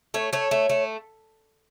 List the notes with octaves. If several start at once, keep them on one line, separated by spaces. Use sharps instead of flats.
A3 C#5
A3 C#5
A3
A3